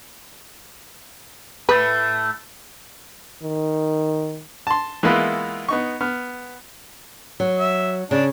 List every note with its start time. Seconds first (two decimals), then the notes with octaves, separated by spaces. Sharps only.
1.69 A2 A3 B4
3.43 D#3
4.67 A5 C6
5.03 E3 G#3 A#3 B3 E4 F4
5.68 B3 D#4 C#6
6.01 B3 F6
7.40 F#3
7.59 E5
8.11 C#3 D4